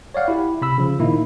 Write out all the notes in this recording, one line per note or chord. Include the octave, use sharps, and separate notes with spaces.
C#5 D5 F5 F#5
E4 G4
C3 B5 E6
C#3 F3
A#2 D#3 A#3 D#4 E4